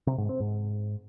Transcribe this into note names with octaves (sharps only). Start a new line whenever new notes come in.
C3
G#2
C4
G#2